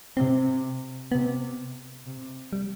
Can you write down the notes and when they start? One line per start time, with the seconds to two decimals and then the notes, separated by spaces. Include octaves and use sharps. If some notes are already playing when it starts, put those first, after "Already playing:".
0.17 C3 C4
1.12 C3 B3
2.06 C3
2.53 G3